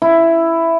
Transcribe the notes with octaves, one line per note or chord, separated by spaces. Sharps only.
E4